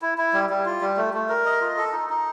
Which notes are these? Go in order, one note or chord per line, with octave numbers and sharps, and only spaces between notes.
E4
E4
G3
G3
F4
G3
A3
A3
A#4
D#5
F4
A4
D#4
D#4